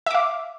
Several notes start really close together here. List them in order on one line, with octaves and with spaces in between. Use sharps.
E5 D6 F5